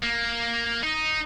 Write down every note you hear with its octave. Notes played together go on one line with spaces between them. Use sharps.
A#3
D#4